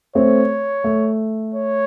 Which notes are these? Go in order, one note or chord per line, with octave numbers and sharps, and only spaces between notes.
A3 C4 C#5
A3
C#5